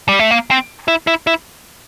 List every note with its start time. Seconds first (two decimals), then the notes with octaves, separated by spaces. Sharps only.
0.09 G3
0.19 A3
0.31 A#3
0.51 C4
0.88 E4
1.07 E4
1.27 E4